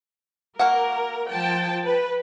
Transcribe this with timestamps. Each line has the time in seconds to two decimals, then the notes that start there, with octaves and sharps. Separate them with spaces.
0.59 A#3 F#4 A#4 F#5
1.31 F3 G5 A5
1.85 B4